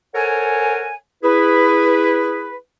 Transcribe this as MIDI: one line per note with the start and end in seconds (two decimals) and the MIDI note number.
0.15 0.92 69
0.15 0.92 70
0.15 0.92 72
0.15 0.92 73
0.15 0.92 78
0.15 0.92 80
1.24 2.55 64
1.24 2.55 68
1.24 2.55 71